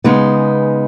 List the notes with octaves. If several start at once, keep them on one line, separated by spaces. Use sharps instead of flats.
C#3 G#3 B3 D#4